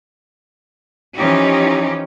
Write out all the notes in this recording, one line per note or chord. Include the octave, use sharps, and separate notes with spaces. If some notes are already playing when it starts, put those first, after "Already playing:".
E3 F3 C#4 D#4 G4